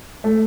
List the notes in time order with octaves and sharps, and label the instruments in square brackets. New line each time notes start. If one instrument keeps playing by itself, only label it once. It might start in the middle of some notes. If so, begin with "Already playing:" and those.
[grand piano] A3